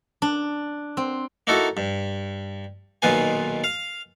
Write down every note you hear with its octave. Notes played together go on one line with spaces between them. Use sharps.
D4
C4
A#3 D#4 E4 F#4 A4
G2
B1 A#2 D#3 F4 B4 G#5
F5